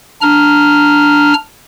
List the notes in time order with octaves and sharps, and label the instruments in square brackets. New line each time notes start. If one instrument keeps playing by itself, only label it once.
[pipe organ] D4 A#5 F6